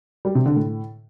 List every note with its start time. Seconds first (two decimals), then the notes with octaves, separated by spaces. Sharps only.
0.25 G3
0.35 C3
0.46 D3
0.56 A2